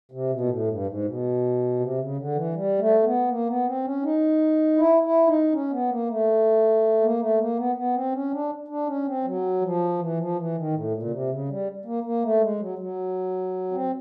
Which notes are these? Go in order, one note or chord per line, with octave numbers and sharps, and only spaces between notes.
C3
B2
A#2
A2
G2
G#2
B2
C3
C#3
D3
E3
G3
A3
B3
A#3
B3
C4
C#4
D#4
E4
E4
D#4
C#4
B3
A#3
A3
A#3
A3
A#3
B3
B3
C4
C#4
D4
D4
C#4
C4
F#3
F3
E3
F3
E3
D#3
A2
A#2
C#3
C3
C#3
G3
A#3
A#3
A3
G#3
F#3
F#3
C4